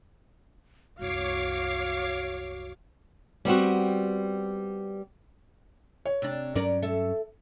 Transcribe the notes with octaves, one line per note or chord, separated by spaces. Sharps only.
C2 F#2 F#4 C#5 F5 D6 C7
G3 B3 C4 F#4
C#5
C3 D4
G2 F#3 C#4 A#4 D5
A4 E5